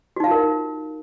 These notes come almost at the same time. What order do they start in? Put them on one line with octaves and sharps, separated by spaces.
F#4 D#4 F5 F4 A#4